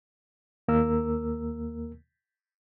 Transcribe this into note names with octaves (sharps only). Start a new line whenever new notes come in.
D#2 A#3 A#4 E6